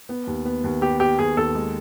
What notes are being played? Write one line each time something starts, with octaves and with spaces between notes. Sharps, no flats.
B3
D#2
B3
D#2
B3 G4
B3 G4
D#2 G#4
D#2 A4
G#3